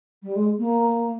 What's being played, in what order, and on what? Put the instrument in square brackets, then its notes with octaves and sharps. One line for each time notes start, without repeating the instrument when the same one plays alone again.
[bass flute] G3
G#3
A#3